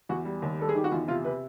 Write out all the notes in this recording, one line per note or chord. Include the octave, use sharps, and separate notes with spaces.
E2 F#4
G3
D#2
G3 A4
G#4
D#3 G4
F#4
E2 F4
C3 F4
C3 B4